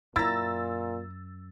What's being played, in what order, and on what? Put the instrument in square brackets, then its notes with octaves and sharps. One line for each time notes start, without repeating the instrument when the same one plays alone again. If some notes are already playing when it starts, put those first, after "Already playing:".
[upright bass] F#2 [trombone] A#2 [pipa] E4 A#5 [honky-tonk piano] E6 A6